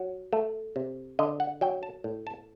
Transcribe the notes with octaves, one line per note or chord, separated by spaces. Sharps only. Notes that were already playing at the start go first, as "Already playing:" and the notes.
Already playing: F#3
A3
C3
D3 D#5
F#5
F#3 G5
A5
A2
A5